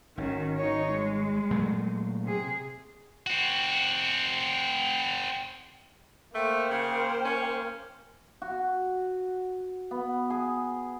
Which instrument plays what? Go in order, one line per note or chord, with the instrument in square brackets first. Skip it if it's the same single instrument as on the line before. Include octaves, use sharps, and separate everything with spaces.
[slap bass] G#1 [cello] D#3 C#4
[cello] D#4 C#5
G#3
[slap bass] A#2 F#3 A3
[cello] C3 G#4
[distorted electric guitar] C4 F#4
[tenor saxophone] A3 [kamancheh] A#3 C5 [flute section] G5 C6
[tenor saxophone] C#3
C#4
[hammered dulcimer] F#4
B3
G#4